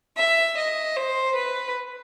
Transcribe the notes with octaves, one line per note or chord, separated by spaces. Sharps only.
E5
D#5
C5
B4